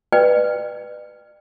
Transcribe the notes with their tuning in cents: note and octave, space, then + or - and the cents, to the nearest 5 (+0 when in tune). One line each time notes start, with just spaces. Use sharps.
B4 +0 D5 +40 G5 +15